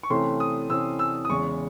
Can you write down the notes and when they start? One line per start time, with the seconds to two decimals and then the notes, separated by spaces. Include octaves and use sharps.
0.03 C#6
0.10 C3 E3 A3 C#4 C6
0.40 D#6
0.70 C3 E3 A3 C#4 E6
0.99 E6
1.25 D#6
1.29 E2 C#3 G#3 C#6